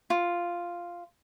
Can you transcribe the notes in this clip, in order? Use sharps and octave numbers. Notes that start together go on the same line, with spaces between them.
F4